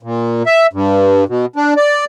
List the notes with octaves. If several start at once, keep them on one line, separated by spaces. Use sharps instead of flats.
A#2
E5
G2
B2
D4
D5